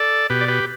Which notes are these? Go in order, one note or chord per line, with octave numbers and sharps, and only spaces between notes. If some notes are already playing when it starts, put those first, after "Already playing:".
Already playing: A4 D5
B2 G4 B4
D5
G4 B4